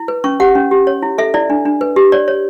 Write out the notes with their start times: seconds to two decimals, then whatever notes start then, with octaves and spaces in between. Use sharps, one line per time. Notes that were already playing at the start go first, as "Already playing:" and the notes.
Already playing: E4
0.08 B4
0.24 C#4 C#6
0.40 G4 F#5
0.55 C#4
0.71 G4
0.87 C#5
1.02 E4
1.18 A4 E5
1.34 E4 D5
1.50 D4
1.65 D4
1.81 B4
1.96 G4
2.12 C#5 D5
2.28 C#5